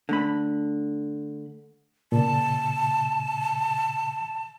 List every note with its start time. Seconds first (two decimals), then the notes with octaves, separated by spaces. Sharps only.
0.09 D3 A3 B5
2.12 A#2 C#3 A5